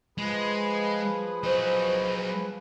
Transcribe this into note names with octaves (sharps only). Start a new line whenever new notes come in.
F3 G#3 G#4 B4
F#3 C5 D#5